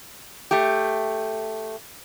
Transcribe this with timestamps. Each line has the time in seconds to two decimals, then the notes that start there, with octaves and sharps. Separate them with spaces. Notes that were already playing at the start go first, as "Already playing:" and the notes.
0.51 A3 G4